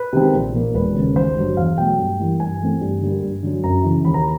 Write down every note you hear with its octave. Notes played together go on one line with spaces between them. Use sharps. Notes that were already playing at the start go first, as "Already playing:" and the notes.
Already playing: B4
C3 D#3 G#3 C4
A#1
A#2 F3 A#3
E1 B4
D#2 C#3
G#1 C5
G2 D3 F#3
E2 F5
B2 F#3 A3 G5
G2
E3 G3 A#3
G2 G#5
E3 A3 C4
G2
D3 G3 A#3
G2
D3 F#3
F#2 A#5
C#3 E3
D#2 B5
A#5